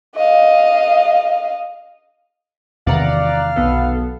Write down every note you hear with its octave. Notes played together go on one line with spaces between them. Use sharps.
D#5 F5
E2 C3 D#3 D5 F5 F#5 A#5
B1 B3 A4